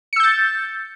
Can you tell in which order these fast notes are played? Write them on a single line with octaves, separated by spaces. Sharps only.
C#7 E6 G6 A6